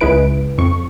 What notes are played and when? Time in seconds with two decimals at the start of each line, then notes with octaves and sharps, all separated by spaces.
0.01 C#2 G#3 E4 B4 D7
0.58 F2 C#6